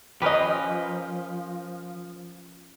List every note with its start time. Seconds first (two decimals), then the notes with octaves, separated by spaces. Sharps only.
0.22 F3 C#4 G4 A#4 B4 D#5